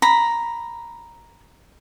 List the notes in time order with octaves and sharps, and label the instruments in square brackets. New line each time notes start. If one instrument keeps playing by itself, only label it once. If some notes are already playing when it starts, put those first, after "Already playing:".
[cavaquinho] A#5 B5